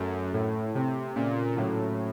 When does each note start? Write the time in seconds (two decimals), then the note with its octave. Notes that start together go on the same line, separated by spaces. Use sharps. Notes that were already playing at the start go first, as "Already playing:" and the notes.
Already playing: F#2 A3
0.33 A2 A3
0.75 C3 C4
1.16 A#2 C#3
1.57 A2 F#3